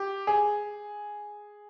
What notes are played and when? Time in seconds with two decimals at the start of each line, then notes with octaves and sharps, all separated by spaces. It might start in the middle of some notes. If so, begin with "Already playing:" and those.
Already playing: G4
0.27 G#4